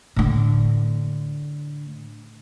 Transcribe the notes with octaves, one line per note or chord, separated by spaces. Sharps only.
A2 D3